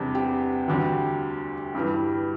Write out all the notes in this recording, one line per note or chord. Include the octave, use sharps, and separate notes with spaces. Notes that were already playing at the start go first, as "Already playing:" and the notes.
Already playing: E2 C3 G3 D4
G4
D2 D3 G3
G2 E3 G3